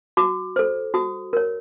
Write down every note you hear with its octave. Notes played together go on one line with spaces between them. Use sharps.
F#4 D6
A4 C5
F#4 D#6
A#4 C#5